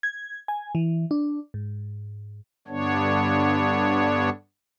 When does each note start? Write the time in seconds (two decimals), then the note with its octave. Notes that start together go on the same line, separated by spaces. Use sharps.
0.03 G#6
0.48 G#5
0.75 E3
1.11 D4
1.54 G#2
2.68 G2 D3 B3 D4 C#5